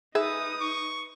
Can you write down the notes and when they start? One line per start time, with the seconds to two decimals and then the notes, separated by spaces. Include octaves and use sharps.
0.15 D#4 G#4 B4 E5 D#6
0.61 C#6